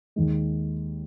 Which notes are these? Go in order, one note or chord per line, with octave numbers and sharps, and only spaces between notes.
D#2 D#3 G#3